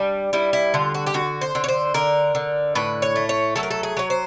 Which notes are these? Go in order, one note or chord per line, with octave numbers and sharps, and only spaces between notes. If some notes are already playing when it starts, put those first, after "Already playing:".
Already playing: G3 D4
G3 E4
E4
D3 F4
F#4
G4
D3 F#4
C5
D3
C#5
C5
D3 A#4
D3
A2 B4
C#5
A3
C#5
F#3 A4
A#4
A4
G#4
F#3 C#5
C5